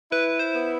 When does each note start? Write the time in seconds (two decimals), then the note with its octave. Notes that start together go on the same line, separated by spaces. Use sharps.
0.12 E4 B4
0.39 C5
0.54 B3